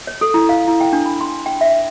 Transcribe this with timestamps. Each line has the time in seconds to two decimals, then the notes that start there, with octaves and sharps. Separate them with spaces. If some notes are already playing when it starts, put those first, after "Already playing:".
0.07 C#5
0.21 A4
0.34 E4
0.49 F5
0.68 E4
0.81 G5
0.93 D4
1.06 B5
1.21 C6
1.46 G5
1.61 E5